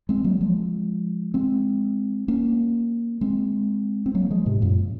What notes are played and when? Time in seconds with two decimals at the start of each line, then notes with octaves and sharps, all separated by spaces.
0.09 G#3 C4
0.24 F#3 A#3
0.41 F3 G#3
1.34 G#3 C4
2.28 A#3 C#4
3.21 G#3 C4
4.06 C4
4.15 F#3 A#3
4.31 F3 G#3
4.46 G#2 C3
4.62 F#2 A#2